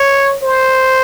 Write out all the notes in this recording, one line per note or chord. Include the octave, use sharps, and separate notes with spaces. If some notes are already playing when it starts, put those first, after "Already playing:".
Already playing: C#5
C5